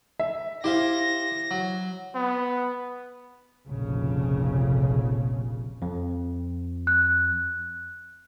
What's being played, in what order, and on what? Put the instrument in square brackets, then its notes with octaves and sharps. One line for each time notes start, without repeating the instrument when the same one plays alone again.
[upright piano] E5
[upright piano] E4 [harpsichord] G4 C5 F5 [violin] A#6
[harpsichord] F#3
[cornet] B3
[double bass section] F1 A#1 C#3
[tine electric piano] F2
[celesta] F#6